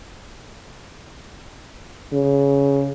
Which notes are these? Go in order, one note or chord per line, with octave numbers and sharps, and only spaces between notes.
C#3